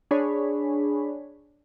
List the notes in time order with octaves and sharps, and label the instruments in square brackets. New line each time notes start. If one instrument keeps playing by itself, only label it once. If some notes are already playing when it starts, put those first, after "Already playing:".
[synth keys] D4 G#4 C#5 B5